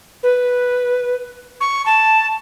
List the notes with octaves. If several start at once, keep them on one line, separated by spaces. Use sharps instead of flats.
B4
C#6
A5